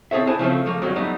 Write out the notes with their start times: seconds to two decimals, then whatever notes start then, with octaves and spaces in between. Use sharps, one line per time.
0.11 C4 G#4 A4 C#5 E5
0.27 D4 E4 C5 G#5 A5
0.39 C#3 F3 A3 C4
0.66 F3 A3 A#3
0.82 G2 C3 D#3 F#3
0.96 F#3 G3 A3 B3 D#4